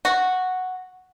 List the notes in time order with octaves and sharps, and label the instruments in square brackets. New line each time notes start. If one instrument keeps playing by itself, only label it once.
[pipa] F#4